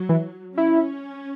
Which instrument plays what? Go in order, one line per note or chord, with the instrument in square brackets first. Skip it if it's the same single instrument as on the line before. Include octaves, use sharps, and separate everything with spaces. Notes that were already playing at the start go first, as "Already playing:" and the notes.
Already playing: [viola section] F#3
[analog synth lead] E3
[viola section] C#4 [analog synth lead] E4